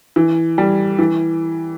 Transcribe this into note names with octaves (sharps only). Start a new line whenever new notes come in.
E3
G3
E3